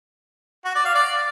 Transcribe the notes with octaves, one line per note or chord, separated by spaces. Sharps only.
F#4
D5
F5
D5